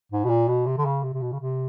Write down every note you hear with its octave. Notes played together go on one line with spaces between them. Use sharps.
G#2
B2
A#2
B2
C3
D3
C#3
C3
C3
B2
C#3
C3